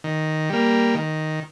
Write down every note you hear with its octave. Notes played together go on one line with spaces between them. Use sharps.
D#3
G3 A#3
D#3